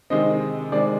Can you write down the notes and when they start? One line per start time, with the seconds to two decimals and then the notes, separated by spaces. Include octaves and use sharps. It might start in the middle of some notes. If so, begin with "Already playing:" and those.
0.10 C3 D#3 G#3 C4 D#5
0.72 C3 D#3 G#3 C4 D5